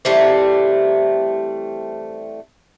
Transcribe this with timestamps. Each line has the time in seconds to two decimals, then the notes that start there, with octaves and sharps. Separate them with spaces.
0.05 E3 G3 A3 C4